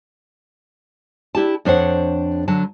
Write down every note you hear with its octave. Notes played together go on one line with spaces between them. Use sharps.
D4 E4 G4 A5
F2 D4 C5 C#5 F#5
D3 F#3 A5